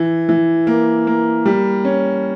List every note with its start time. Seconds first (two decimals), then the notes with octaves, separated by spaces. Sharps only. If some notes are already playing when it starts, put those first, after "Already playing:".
Already playing: E3
0.29 E3
0.67 A#3
1.07 A#3
1.46 G3
1.85 C#4